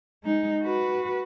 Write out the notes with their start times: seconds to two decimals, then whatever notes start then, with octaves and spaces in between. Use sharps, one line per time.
0.24 G#3 D#4
0.62 F#4 B4